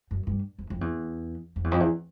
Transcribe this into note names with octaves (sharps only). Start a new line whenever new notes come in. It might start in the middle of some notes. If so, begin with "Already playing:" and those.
F#2
G2
F2
F2
E2
F2
E2
F2
E2